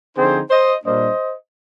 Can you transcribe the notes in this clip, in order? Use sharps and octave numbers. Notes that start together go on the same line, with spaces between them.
D3 F3 C4 D#4 G#4 C5
C5 D#5
A#2 G3 A#3 D4 C5 D#5